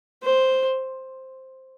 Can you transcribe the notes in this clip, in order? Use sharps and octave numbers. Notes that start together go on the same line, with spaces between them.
C5